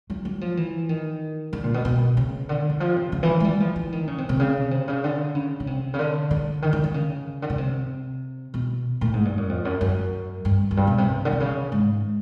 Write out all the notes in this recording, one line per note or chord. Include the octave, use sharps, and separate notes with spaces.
F#3
F#3
F3
E3
D#3
D3
A#2
B2
B2
C#3
D3
E3
F3
C3
C#3
E3
G#3
G3
F3
E3
D#3
C#3
C3
C3
C#3
C3
C#3
D3
C#3
C#3
C3
C#3
D3
D3
D#3
D3
D3
C#3
D3
C#3
C3
B2
A2
G#2
G2
F#2
F2
F#2
F#2
G2
F#2
G2
B2
C3
C3
D3
C3
C#3
G#2